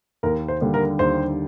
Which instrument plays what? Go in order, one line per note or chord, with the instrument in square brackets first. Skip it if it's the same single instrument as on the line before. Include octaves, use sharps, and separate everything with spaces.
[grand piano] D#2 [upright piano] A#4
[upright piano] C5
[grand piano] D3 G3 A#3
[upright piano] A#4
[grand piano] D#2 [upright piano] C5